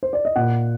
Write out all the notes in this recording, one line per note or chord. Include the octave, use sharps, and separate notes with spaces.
C5
D5
D#5
A#2 F#5